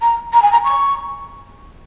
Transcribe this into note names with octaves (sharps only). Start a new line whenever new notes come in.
A#5
A#5
G#5
A#5
C#6